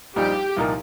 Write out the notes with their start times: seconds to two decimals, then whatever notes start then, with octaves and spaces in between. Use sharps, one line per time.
0.16 A#1 A#2 G3 D#4 G4
0.56 C2 A#2 F3 D#4 A#4